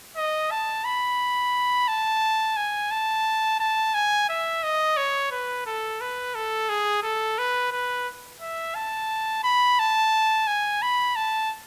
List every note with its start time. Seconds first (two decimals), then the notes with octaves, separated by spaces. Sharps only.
0.16 D#5
0.51 A5
0.84 B5
1.88 A5
2.57 G#5
2.91 A5
3.60 A5
3.94 G#5
4.29 E5
4.63 D#5
4.97 C#5
5.31 B4
5.66 A4
6.01 B4
6.35 A4
6.69 G#4
7.03 A4
7.38 B4
7.72 B4
8.41 E5
8.75 A5
9.44 B5
9.79 A5
10.47 G#5
10.82 B5
11.16 A5